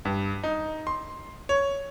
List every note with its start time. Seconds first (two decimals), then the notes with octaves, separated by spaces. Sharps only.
0.05 G2
0.44 D#4
0.87 C6
1.49 C#5